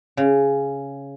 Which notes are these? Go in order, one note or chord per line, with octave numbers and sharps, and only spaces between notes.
C#3